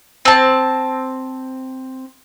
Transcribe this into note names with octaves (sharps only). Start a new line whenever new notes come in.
C4 A5